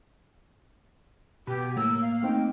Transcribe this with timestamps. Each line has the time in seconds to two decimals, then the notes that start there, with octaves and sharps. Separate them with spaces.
1.47 B2 G4
1.77 A2 A#3 E6
2.02 F5
2.23 A3 C4 D#4 G5